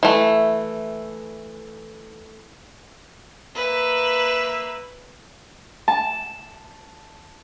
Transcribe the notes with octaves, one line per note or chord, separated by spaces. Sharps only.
E3 A3
A#3 B4 E5
A5